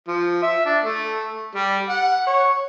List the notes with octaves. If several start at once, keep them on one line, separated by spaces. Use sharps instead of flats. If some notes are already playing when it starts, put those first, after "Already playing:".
F3
E5
D4
A3
G3
F#5
C#5